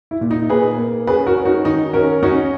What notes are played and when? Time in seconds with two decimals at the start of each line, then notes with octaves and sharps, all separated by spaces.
0.11 E4
0.21 A#2
0.31 D#4
0.50 A#2 G#4 B4
0.78 A#3
1.07 C#4 G#4 B4
1.26 F#4 A#4
1.36 C#4
1.45 D#4 F#4
1.65 D#3 D#4
1.93 C#4 F#4 A#4
2.23 C#4 D#4 F#4